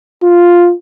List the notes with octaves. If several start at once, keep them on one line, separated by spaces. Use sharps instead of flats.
F4